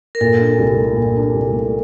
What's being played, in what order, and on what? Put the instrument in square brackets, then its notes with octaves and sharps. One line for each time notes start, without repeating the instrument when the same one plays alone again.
[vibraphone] A#4
[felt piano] A#2 [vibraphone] A4
[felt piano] D4
C2
A3
A#2
D4
C2
A3